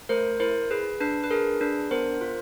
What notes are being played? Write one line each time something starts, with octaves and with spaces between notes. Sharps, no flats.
A3 A#4 C5
E4 A#4 C5
G#4 B4
D4 B4
B4
G#4 A#4
D4 B4
B3 A#4 C5
F4